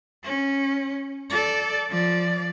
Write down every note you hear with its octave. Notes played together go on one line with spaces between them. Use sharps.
C#4
A4 D5
F3 D5